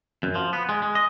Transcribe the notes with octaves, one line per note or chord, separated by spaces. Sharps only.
F#2
F3
B3
G#3
G#3
D#5